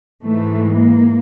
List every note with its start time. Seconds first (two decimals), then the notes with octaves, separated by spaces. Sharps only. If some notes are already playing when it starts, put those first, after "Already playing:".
0.23 G#2 E3 G#3 A3
0.76 A#3